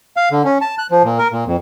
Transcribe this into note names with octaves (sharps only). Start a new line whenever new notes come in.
F5
D3
C#4
A5
F#6
F3
A#2
A#4
A#2
F2